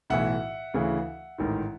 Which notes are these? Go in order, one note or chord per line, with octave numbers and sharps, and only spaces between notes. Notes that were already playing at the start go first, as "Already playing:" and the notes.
B1 A2 E3 E5 F#5
D2 C#3 E3
A1 G#2 D#3